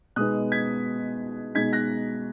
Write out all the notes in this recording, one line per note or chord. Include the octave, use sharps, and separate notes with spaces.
B2 G#3 B3 D#4 D#6 F#6
G#6 B6
B2 G#3 D#4 G#6 B6
F#6 A#6